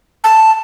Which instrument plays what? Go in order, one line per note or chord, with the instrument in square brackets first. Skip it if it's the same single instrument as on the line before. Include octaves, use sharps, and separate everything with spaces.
[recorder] A5